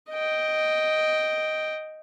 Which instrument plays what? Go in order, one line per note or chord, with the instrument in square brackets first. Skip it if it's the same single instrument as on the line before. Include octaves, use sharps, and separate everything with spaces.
[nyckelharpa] D#5 G5